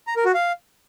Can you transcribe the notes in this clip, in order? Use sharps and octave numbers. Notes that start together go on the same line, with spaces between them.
A#5
A#4
F#4
F5